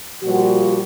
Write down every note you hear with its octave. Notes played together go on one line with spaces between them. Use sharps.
A#2 F3 G3 F#4